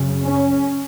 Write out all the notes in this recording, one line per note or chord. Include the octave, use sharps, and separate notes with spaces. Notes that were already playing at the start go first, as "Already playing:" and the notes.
Already playing: F#2 C#3
C#4